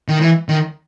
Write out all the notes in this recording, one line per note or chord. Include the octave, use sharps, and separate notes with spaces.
D#3
E3
D#3